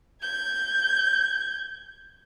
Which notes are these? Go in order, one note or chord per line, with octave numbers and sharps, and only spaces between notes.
G6 G#6